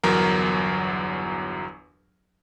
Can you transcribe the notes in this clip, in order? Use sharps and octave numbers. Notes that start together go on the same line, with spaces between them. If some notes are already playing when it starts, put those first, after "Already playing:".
G1 E2 F#3 A#4